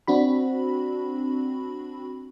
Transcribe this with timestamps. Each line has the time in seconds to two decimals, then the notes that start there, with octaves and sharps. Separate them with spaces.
0.07 C4 D4 F#4 B5